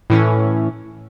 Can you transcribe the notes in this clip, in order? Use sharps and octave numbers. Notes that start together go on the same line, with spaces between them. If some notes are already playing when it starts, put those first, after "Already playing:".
A2 E3 C#4